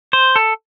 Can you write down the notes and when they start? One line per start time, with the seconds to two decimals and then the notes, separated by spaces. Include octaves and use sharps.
0.13 C5
0.36 A4